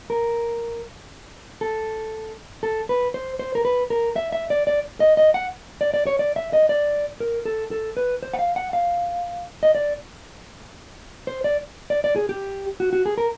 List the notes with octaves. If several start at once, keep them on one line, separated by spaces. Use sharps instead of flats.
A#4
A4
A4
B4
C5
C5
A#4
B4
A#4
E5
E5
D5
D5
D#5
D#5
F#5
D5
D5
C#5
D5
E5
D#5
D5
A#4
A4
A4
B4
C5
F#5
F5
F#5
F5
D#5
D5
C5
D5
D5
D5
G#4
G4
F#4
F#4
G#4
A#4